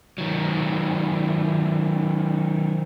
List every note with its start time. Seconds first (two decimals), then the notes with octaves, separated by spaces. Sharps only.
0.18 D#3 F#3